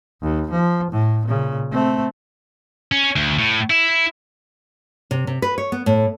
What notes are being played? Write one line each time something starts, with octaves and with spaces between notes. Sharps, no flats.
D#2
F3
A2
A#2 C#3
A3 C4
C#4
D2
A2
E4
C3
C3
B4
C#5
B3
A2